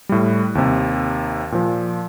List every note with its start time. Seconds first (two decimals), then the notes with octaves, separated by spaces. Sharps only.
0.09 A2 G3
0.55 D#2 C3
1.52 A#2 F3